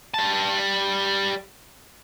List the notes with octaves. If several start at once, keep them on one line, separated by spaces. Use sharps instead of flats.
G3 A5